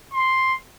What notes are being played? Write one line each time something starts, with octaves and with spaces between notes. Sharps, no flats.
C6